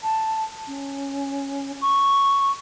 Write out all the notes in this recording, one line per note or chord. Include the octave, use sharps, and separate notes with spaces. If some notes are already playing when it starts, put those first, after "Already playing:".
A5
C#4
C#6